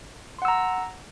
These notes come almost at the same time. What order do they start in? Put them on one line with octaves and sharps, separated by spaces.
C6 F#5 E6 A#5